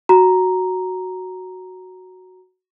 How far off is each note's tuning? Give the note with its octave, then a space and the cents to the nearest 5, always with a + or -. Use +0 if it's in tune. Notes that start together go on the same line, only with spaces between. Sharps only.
F#4 +0 A#5 +0